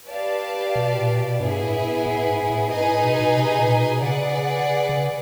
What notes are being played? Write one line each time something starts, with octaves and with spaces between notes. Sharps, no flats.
G4 B4 D5 F5 A5
B2
A#2
B2
G2 B3 E4 G#4
A2
A2
G#2
A2
G#2 D#4 G#4 B4 D#5 G#5
A2
B2
B2
C3
A#2
B2
C#3 G#4 B4 D5 F#5
C#3